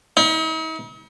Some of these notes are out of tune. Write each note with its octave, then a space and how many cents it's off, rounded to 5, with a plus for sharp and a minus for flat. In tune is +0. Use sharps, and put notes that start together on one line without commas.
D#4 +45